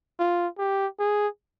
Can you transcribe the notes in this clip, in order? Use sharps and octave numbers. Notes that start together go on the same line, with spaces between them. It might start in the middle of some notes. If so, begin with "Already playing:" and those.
F4
G4
G#4